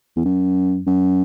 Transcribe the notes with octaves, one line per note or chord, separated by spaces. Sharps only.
E2
F#2
F#2